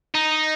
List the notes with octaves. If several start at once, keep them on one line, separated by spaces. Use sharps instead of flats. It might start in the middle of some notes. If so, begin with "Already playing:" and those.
D#4